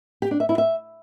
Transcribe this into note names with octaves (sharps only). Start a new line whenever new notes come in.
G4
D4
E5
E4
E5